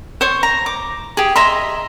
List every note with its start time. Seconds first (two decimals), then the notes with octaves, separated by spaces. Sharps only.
0.21 C5 C#5
0.43 A#5
0.66 D6
1.17 G4 G#4
1.36 D#5 E5 A#5 C6